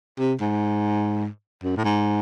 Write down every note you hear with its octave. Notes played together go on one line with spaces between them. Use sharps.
C3
G#2
F#2
A2
G#2